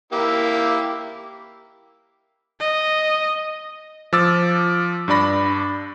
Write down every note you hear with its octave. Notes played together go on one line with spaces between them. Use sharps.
A#3 E4 G4
D#5
F3 D6 E6 A6
G2 D4 D5 B5 A#6